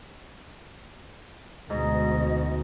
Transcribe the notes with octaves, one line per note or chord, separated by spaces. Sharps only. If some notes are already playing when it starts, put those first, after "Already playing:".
D2 G#2 B2 D#5